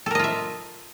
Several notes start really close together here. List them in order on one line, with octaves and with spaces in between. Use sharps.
A4 A#4 D#5 F4 E5